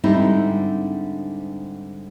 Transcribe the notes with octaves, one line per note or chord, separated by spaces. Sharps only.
G#2 D3 G3 C4 D#4 E4